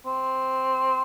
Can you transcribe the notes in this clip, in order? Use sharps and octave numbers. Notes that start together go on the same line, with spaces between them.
C4